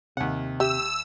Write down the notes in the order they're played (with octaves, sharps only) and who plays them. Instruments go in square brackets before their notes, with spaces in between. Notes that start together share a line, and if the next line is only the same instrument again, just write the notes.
[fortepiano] D#2 F#5 [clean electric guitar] C3
[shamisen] G4 E5 [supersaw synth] E6